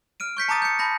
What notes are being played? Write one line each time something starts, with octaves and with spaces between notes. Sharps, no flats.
F6 D7 D#7
C#6 G6 B6 C#7
A5 A#5 D6 D#6 A6 D#7
G6 C#7
A5 B5 G6 A#6